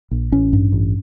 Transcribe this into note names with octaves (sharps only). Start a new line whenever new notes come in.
A#1
A1 C#4
G2
A1